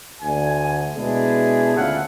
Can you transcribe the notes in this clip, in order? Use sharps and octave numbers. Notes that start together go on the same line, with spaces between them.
D2 G#5
B2 G#3 D4 E4 G#4
D2 C#3 A3 F4 F#5